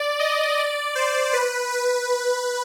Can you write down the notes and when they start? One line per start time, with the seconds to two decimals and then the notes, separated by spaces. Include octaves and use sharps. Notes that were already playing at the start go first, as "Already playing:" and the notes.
Already playing: D5
0.19 D#5
0.57 D5
0.95 C5
1.33 B4
1.71 B4